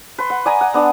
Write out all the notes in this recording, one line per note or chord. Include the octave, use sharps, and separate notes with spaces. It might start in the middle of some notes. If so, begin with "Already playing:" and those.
B4 C6
F#5
D5 G#5 A#5 D#6
F#5
B3 D4 D5